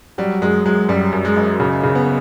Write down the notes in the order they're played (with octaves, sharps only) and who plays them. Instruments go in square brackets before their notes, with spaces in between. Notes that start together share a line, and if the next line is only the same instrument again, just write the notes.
[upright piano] F#3 [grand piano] G3
[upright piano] F#2 [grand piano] G#3
[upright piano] F#3 [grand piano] G#3
[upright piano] F#2 [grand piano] G3
[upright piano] F#2
[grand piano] G#3
[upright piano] F#1
C#3
C#3
[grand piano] B3